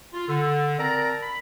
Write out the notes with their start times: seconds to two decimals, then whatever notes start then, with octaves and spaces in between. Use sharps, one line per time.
0.14 F4
0.29 D3
0.79 C4 A#4 D5 A5 A#5
1.22 B5